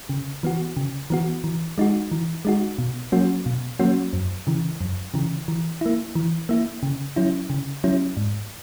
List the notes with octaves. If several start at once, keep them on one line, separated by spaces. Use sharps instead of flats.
C#3
E3 B3 F#4
C#3
E3 B3 F#4
E3
G#3 D#4 F#4
E3
G#3 D#4 F#4
B2
F#3 A#3 C#4 F#4
B2
F#3 A#3 C#4 F#4
F#2
C#3 E3
F#2
C#3 E3
E3
A#3 E4
E3
A#3 E4
C#3
F#3 C#4 E4
C#3
F#3 C#4 E4
G#2